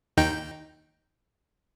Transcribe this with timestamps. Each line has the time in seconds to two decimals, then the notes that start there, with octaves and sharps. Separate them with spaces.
0.17 D#2 D#4 G5